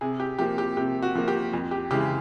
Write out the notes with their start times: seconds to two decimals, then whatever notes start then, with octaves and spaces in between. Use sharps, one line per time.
0.01 C3 G#4
0.20 G4
0.39 F3 A#3 G4
0.58 G4
0.77 C3 G4
1.02 F#4
1.15 F3 A#3
1.28 G4
1.53 F2
1.71 G4
1.91 C#3 E3 G#3 G4